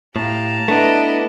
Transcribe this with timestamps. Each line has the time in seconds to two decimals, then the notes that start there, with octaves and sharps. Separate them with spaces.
0.16 A2 G4 F5 A5 A#5
0.68 A3 B3 D4 E4 B4 D#5